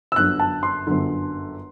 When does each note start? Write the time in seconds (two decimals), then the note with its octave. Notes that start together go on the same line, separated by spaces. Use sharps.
0.12 E6
0.16 G1 F#2 D3 F#6
0.39 A5
0.63 C6
0.87 G1 F#2 D3